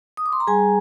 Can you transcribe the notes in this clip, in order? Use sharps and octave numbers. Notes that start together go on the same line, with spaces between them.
D#6
D6
C6
A#5
G3 G#4 G#5